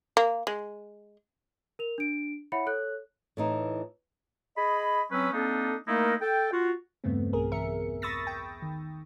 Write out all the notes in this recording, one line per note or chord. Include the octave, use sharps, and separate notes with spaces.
A#3
G#3
A#4 F7
D4 D7
E4 C#5 E5 F#5 B5 C#7
A4 C#5 F#6
A2 E3 D#4
G#4 D#5 B5
F#3 C4 C#4 B4 E6
A#3 C4 D4 D#4 A4
A3 A#3 D#4 E4 A#4
A4 G5
F4 F#4
E2 G2 C#3 A3 B3 C4
B1 G#4 A#4
E2 G#4 A#4 E5 C#7
B5 C#6 D#6 E6 A6 A#6
G5
D#3